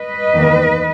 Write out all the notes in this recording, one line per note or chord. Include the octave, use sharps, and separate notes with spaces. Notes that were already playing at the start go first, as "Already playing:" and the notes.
Already playing: B4 D#5
E2 D#3 A#3